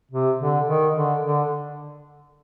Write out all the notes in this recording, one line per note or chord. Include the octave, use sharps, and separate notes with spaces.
C3
D3
D#3
D3
D3